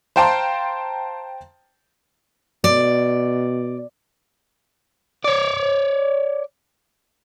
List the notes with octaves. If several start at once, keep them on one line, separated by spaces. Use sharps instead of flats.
C5 F5 G5 A5 A#5 C6
B2 D5
C#5 D5